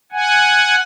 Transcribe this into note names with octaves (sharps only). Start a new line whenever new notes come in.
F#5 G#5